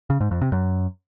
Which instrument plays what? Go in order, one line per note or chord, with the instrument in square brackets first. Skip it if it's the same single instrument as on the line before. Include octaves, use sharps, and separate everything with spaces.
[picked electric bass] C#3
G#2
F2
C3
F#2